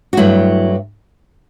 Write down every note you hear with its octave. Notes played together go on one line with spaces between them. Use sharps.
F#4
G2 F#3 A3 E4